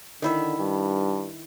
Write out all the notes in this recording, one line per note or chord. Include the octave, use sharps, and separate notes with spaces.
D3 D#3 E4 E5
G2